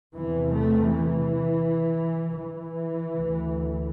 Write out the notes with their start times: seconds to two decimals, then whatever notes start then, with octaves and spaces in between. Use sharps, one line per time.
0.15 E2 C3 E3
0.53 A3
0.90 E3
2.38 E3
3.12 D2